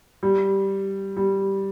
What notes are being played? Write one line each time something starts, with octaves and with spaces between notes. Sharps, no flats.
G3
G3